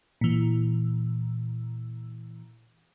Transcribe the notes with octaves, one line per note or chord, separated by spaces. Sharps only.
A#2 E3